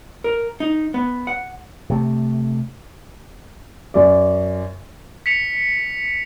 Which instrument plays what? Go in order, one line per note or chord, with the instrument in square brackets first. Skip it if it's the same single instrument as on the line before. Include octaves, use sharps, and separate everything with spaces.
[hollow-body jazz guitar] A#4
D#4
B3
F#5
[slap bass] C3 A3
[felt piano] F#2 D5
[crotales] B6 C#7 F7